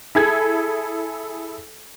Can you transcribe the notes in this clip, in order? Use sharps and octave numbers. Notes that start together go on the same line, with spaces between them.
E4 G#4 A4 G#6